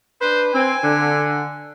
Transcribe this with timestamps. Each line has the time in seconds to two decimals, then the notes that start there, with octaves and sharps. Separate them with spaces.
0.21 D4 B4 C5
0.54 C4 G#5
0.83 D3